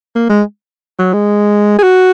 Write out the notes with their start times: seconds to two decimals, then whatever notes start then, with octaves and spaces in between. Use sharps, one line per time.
0.15 A#3
0.29 G#3
0.99 F#3
1.13 G#3
1.79 G#4
1.83 F#4